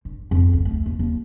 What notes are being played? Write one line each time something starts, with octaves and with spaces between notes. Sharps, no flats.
G2
F2
D2
A3
D#2
D#2